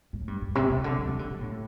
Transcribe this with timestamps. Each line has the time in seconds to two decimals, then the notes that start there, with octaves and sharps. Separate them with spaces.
0.13 A2
0.28 G2
0.41 G2
0.55 C3
0.70 C3
0.84 D3
0.98 D3
1.09 E3
1.19 D3
1.30 D3
1.41 A2